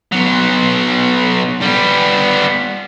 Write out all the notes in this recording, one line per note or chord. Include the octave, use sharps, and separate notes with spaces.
B1 F#3
G3 B3